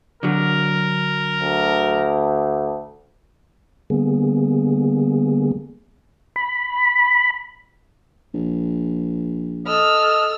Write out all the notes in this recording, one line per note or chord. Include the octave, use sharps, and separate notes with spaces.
D3 F#3 A#4
D2
D3 G3 A#3 B3 G#4
B5
A#1
A4 D#5 E6 F6